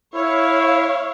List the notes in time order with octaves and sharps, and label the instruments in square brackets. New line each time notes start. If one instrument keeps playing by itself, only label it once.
[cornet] E4 [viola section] C#5 F5